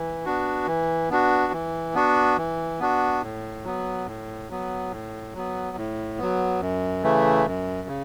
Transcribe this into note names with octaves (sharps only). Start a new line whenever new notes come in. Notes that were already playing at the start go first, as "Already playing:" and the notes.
Already playing: E3
B3 D4 F#4
E3
B3 D4 F#4
E3
B3 D4 F#4
E3
B3 D4 F#4
A2
F#3 B3
A2
F#3 B3
A2
F#3 B3
A2
F#3 B3
F#2
C#3 E3 A3
F#2
C#3